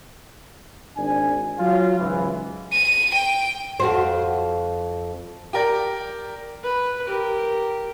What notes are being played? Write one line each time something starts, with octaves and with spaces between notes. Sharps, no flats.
G#1 D4 G#5
F#3 F4
C#2 G#2 E3
D#7
G5
F2 F#4 C5
G4 A#4 D5
B4
G4 A#4